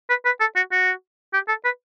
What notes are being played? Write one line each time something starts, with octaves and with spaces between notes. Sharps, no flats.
B4
B4
A4
F#4
F#4
G4
A4
B4